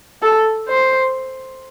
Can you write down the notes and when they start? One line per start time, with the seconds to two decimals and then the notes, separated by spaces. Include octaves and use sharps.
0.22 A4
0.68 C5